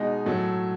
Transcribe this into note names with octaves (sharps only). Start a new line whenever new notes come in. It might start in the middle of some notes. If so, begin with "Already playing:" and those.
Already playing: B2 G#3 D#4
A2 F#3 A3 A4